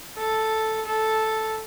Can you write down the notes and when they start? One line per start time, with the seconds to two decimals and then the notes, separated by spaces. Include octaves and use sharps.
0.18 A4
0.85 A4